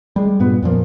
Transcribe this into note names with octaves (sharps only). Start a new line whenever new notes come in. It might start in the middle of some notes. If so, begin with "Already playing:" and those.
G3 G#3
G2 A#2 B3
F2 A#2 F3 A#3